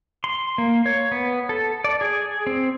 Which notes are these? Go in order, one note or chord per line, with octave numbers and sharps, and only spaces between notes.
C6
A#3
C#5
B3
A4
D5
G#4
C4